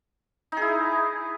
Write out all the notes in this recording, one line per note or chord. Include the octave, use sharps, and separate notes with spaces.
D#4 E4 G#4